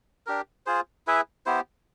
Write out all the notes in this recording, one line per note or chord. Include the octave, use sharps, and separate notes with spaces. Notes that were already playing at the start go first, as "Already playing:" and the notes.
D4 G4 A#4
F4 G#4 C5
E4 G#4 B4 E5
B3 E4 G4 C5